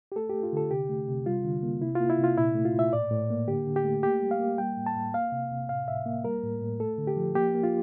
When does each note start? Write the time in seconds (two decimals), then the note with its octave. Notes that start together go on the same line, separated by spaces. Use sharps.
0.12 G4
0.16 A3 A4
0.30 A3 G4
0.43 F4
0.53 D3 A4
0.71 C3 G4
0.89 A3
1.08 C3
1.26 G3 F4
1.45 D3
1.63 A#3
1.82 C3 E4
1.95 A#3 F4
2.10 E4
2.19 C3 F4
2.37 A#2 E4
2.55 A3
2.65 F4
2.74 A#2 E5
2.93 A2 D5
3.11 A2
3.30 A#3
3.48 D3 G4
3.67 D3
3.76 G4
3.85 A3
4.03 A#3 G4
4.22 G3
4.31 F5
4.40 A#3
4.58 G3 G5
4.77 A2
4.86 A5
4.96 A2
5.14 A#3 F5
5.32 C3
5.51 C3
5.69 A2 F5
5.88 A2 E5
6.06 A#3
6.24 G3 A#4
6.43 A2
6.61 A2
6.80 A3 A4
6.98 D3
7.07 G4
7.17 F3
7.35 A#3 G4
7.55 A#3
7.63 F4